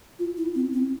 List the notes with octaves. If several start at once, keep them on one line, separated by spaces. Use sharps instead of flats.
F4
E4
C4
C4